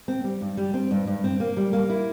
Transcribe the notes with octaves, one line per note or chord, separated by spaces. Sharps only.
C4
G3
G2
G3
C4
G2
G2
C4
A#3
G3
A#3
E4